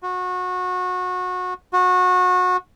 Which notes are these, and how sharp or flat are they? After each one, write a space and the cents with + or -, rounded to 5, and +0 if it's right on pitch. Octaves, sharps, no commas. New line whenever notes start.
F#4 -25
F#4 -25